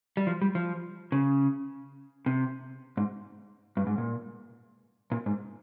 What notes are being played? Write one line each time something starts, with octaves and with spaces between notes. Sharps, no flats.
G3
F3
G3
F3
C#3
C3
G#2
G2
G#2
A#2
A#2
G#2